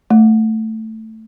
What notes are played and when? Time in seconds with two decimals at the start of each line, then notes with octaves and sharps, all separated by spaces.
0.10 A3